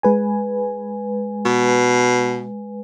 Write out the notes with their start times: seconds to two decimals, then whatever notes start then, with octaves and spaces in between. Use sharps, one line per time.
0.03 G#3 B4 G#5
1.45 B2